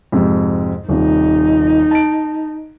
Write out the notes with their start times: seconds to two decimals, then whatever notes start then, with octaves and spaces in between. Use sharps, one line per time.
0.12 F2 G#2 C3
0.89 D#1 C3 D#4
1.91 A5 D7